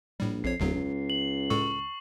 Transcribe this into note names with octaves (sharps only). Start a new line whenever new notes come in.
A#1 A2 G3
A#1 F2 C#5 C7
D1 G1 E2 F#3
C#2
F#7
A2 G#3 A4 C#6